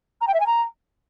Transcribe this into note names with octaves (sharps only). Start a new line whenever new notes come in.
A#5
G5
E5
G#5
A#5